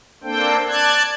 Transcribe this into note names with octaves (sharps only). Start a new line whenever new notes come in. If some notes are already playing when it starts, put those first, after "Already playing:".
A#3 C4 D4 A4 C5 G5
D5 A5 F#6 G#6